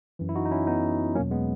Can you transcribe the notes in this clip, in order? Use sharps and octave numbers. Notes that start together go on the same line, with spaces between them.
F#2 E3
E4
D#4 F#4
D#4
C#4 E4
B3 D#4
E2 B2 F#3 A#3 C#4
G#3 B3